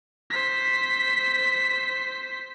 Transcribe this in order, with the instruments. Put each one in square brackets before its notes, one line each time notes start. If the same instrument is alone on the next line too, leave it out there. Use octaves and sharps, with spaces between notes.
[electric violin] C5 B6